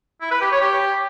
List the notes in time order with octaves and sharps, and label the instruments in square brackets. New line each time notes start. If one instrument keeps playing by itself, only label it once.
[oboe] E4
B4
G4
C#5
G4